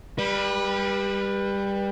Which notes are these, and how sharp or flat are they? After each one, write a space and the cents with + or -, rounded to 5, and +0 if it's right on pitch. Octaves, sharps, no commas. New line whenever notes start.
G3 +20 B4 -20